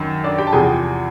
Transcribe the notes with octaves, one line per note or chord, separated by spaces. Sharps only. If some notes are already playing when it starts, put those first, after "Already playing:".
Already playing: F#2 D#3
D4 D5
G4 G5
A5
E2 C3 F3 G#4 G#5